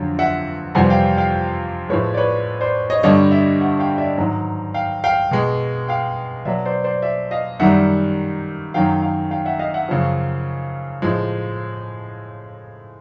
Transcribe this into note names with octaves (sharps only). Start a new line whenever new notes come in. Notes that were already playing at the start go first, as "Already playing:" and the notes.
Already playing: F2 D3 F#3
E5 F#5
F2 C3 E3 G3 F#5 G#5
F5 G5
F5 G5
A2 F3 G#3 B4 C#5
D5
B4 C#5
C5 D5
C#5 D#5
G2 D3 G3 C#5 D#5
D5 E5
E5 F#5
F5 G5
D5 E5
G#2 D#3 F#3
F5 G5
F5 G5
B2 G#3
F5 G5
B2 F#3 D5 E5
C5 D5
C5 D5
D5 E5
D#5 F5
F#2 D#3 G3 E5 F#5
F#2 D#3 F#3 F5 G5
F5 G5
F5 G5
E5 F#5
D#5 F5
E5 F#5
F#2 C#3 F3
A2 F3 G#3